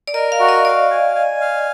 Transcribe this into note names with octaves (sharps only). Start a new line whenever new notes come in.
D5
A#4 D#5
F5
F#4
D#5
D5 F5
G#5
G#5
F5